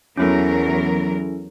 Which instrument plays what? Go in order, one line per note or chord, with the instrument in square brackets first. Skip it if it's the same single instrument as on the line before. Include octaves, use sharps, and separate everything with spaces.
[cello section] E2 F#3 A#4 [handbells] C#4 E4 A4